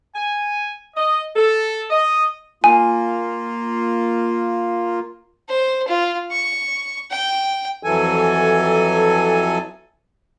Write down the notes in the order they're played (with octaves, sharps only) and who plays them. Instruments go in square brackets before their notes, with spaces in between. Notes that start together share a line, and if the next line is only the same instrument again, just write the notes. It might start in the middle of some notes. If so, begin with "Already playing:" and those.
[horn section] G#5
D#5
A4
D#5
[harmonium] A#3 F4 [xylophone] G#5
[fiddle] C5
F4
C#6
G5
[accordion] F2 E3 F#3 A4 G#5